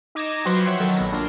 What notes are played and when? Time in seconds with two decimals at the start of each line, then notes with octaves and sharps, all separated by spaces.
0.15 D#4 D6 G#6 A#6 E7
0.45 F3 F#3 F#4 B4 C5 C6
0.65 C#5 E5 F#5 G5 C6 C#6
0.80 D#3 F#3 A4
0.97 A#1 B3 A#6
1.12 A#3 D4 F4